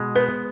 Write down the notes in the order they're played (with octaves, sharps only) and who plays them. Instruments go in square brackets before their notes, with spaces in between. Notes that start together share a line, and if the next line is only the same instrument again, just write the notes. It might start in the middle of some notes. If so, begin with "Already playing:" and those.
Already playing: [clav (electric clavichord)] B2 G#3
[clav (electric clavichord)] B3 [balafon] B4